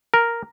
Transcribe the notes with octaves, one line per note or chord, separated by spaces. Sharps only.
A#4